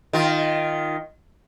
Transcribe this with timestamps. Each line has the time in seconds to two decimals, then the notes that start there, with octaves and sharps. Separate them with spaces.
0.13 D#3 F4